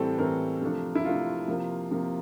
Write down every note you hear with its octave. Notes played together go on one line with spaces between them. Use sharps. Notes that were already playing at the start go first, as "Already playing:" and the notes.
Already playing: A2 E3 G3 C4 A4
A2 E3 G3 C4 A#4
C3 F3 A3 D4
E4
C3 F3 A3 D4 F4
C3 F3 A#3
C3 F3 A#3